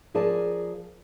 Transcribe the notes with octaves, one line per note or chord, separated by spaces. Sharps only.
F3 G#4 A#4 D5 A5